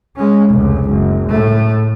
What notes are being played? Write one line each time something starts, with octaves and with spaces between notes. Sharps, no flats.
G#3 C#4
F1 C#2
F#1
A2 A3